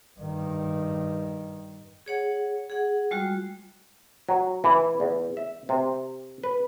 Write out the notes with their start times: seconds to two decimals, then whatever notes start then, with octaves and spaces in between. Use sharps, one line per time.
0.19 G2 D#3
2.06 G#4 C#5 F#5
2.70 G#4 F#5
3.11 G3 G#3 F4 F#4
4.29 F#3
4.64 E3
5.00 E2
5.37 E5
5.69 C3
6.44 B4